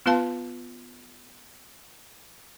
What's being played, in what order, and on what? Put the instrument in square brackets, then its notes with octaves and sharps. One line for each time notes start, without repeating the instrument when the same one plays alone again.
[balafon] B3 F4 B4 F5 A5 C6